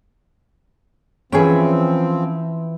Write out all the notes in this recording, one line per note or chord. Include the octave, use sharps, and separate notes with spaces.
E3 F3 C4 C#4 G#4 E5 G5